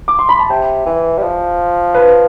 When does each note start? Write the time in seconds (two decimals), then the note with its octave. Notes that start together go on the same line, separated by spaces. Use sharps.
0.08 D6
0.19 C6
0.29 B5
0.39 A5
0.50 C3 G5
0.86 E3
1.18 G3
1.23 F3
1.94 B4